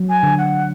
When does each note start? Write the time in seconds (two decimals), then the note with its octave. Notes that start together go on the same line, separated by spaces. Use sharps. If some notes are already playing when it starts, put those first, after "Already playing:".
Already playing: F#3
0.09 G#5
0.23 D3
0.37 F#5